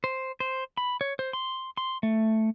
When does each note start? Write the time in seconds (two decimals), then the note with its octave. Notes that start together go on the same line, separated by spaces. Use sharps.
0.04 C5
0.40 C5
0.77 B5
1.01 C#5
1.19 C5
1.33 C6
1.77 C6
2.03 A3